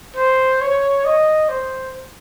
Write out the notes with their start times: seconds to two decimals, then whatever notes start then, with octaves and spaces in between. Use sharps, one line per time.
0.16 C5
0.61 C#5
1.05 D#5
1.49 C5